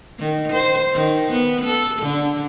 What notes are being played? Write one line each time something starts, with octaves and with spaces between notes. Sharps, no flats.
D#3
C5
D#3
B3
A4
D3